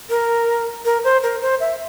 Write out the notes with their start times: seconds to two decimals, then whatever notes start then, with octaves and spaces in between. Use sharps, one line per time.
0.10 A#4
0.85 A#4
1.04 C5
1.23 A#4
1.42 C5
1.60 E5